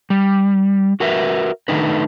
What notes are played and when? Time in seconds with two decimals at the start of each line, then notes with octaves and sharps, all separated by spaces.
0.10 G3
1.00 F#4 A#4 B4 E5
1.68 D#3 G3 A3 D4 D#4 B4